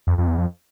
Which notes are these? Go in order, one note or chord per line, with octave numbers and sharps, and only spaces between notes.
F2
F2
E2
F2